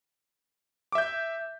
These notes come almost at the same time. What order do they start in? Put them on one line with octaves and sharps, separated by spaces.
D6 E5 G6